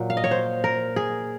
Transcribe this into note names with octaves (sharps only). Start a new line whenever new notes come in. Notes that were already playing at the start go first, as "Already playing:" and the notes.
Already playing: A#2 F#3
F5
D#5
C#5
C5
A#4
G#4